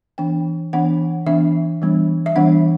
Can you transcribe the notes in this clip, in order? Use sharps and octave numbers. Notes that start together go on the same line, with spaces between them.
E3 B3 D4 G5
E3 B3 D4 F#5
E3 B3 D4 E5
E3 G3 B3 D4
E5
E3 G3 B3 D4 F#5